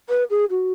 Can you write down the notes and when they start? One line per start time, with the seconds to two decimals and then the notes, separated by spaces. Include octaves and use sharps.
0.09 B4
0.30 G#4
0.50 F#4